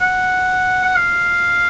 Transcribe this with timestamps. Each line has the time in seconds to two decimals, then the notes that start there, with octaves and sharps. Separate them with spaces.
0.01 F#5
0.85 F#5
0.96 F5